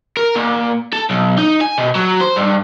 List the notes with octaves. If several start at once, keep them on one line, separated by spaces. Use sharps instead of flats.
A#4
A#2
A4
B1
D#4
G#5
B2
F#3
C5
G2